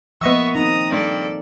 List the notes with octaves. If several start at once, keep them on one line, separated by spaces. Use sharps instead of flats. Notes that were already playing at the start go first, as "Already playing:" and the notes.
F3 A#3 B3 D#5 E5 C#6 E6
C4 D#4 A#5 D#6
G2 A4 D5